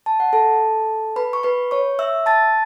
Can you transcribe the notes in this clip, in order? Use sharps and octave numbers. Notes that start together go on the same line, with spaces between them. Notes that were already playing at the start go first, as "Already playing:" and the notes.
A5
F#5
A4 A5
B4 B5
C#6
B4 B5
C#5 C#6
E5 E6
A5 A6